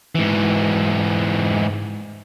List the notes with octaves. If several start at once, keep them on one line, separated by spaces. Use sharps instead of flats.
G#2 E3